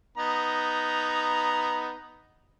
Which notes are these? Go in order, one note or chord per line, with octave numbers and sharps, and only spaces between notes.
B3 D#4 A#5